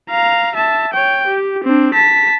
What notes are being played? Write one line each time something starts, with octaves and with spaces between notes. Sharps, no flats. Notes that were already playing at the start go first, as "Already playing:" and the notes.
F5 A#5
E5 A5
C#5 G5
G4
C4 D4
A5 B6